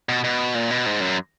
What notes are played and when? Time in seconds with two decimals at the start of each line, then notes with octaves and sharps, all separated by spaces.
0.09 B2
0.24 B2
0.55 A#2
0.70 B2
0.86 G#2
1.01 F#2